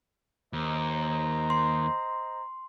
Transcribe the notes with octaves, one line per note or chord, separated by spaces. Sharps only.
D#2 C5 D#5 A#5
C6